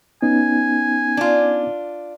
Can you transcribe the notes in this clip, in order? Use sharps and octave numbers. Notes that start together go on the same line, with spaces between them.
B3 C#4 D#4 G#5
D4 F4